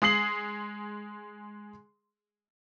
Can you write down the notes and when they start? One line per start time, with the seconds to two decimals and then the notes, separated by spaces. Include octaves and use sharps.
0.02 G#3 G#4 D#6 C7 F#7